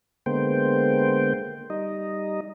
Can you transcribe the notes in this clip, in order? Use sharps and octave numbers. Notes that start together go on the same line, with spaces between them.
D3 G#3 A#3 B3 C5 G5
G3 D#4 D#5